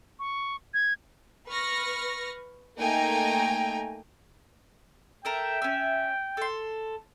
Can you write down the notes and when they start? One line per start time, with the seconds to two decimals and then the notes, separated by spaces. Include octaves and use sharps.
0.19 C#6
0.74 G#6
1.48 B4 C#6 F6 A#6
2.78 A3 A#3 D#4 G5 G#5 A#5
5.25 A4 A#4 E5 G5
5.62 C#4 E5
6.37 A4 C6